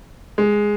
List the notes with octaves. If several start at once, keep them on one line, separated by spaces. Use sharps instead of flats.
G#3